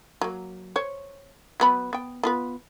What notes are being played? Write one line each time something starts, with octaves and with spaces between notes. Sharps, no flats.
F#3 A#3
C5 C#5
F#3 B3 B5
B3 G5
B3 F4 B4